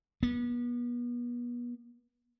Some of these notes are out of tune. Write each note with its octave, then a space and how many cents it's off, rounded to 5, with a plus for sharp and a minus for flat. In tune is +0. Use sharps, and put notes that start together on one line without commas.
B3 -35